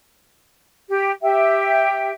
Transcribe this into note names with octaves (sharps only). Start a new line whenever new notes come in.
G4
G4 E5 G5